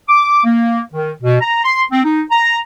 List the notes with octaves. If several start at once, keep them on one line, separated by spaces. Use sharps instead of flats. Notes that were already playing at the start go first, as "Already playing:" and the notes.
D6
A#3
D#3
B2
A#5
C6
C4
D#4
A#5